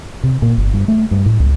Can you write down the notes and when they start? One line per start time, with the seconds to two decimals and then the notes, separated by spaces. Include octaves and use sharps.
0.23 C3
0.42 A#2
0.58 G1
0.74 G2
0.88 A3
1.11 G2
1.26 A2
1.40 C#2